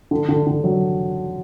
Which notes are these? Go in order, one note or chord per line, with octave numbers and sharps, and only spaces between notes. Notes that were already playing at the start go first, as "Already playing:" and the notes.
D3
D3
D3
F#3